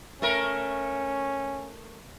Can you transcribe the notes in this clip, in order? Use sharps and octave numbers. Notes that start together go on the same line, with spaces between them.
A3 C#4 A#4